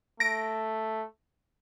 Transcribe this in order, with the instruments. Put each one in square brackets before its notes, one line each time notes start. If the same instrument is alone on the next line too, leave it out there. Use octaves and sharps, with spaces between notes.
[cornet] A3 [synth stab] A#6 D7